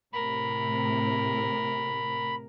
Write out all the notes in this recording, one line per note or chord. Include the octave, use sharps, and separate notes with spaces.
A2 C3 A#4 B5